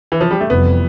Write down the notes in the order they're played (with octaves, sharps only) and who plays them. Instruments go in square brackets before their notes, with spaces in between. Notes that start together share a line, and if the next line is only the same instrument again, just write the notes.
[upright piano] E3
F3
G3
A3
[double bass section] F1 F2 E3 G3 [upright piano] B3